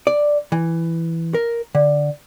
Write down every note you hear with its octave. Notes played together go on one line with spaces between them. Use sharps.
D5
E3
A#4
D3